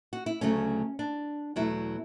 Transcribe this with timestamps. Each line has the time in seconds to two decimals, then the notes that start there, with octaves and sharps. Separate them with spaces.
0.13 F#4
0.26 E4
0.41 D2 C#3 F#3 A3 C#4
0.99 D4
1.56 E2 B2 F#3 A3 E4